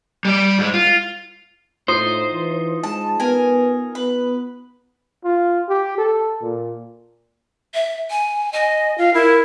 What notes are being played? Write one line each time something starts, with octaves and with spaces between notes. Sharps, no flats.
G3 D5
G#2 G#3
F4
A2 D#4 F4 C5 D#6
E3
G#3 A5
B3 A#4 G#5
B3 B4
F4
G4
A4
A#2
E5
G#5
D#5 G#5
F4 F5
E4 A#4